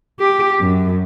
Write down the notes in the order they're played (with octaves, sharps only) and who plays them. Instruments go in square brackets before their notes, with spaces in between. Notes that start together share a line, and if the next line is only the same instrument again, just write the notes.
[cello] G4
F#2